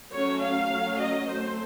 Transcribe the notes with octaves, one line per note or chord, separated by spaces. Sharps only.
F#3 A3 C#4 C#5
F5
F#3 A3 C#4
D#5
F#3 A3 C4 C5